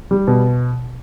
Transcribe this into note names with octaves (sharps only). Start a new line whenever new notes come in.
G3
B2